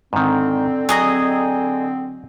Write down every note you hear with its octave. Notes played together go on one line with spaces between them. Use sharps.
G#2 D3 D#3 C4
F#3 G#4 D#5 A#5